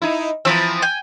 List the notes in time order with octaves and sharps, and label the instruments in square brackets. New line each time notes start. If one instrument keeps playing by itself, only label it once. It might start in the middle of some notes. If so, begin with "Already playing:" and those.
[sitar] D#4 E4
[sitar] E3 F3 C4 [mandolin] A#5 B5 E6
[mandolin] G5 G#5